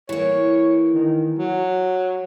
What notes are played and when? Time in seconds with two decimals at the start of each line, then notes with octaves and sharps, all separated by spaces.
0.09 E3 A#3 C#5
0.94 D#3
1.39 F#3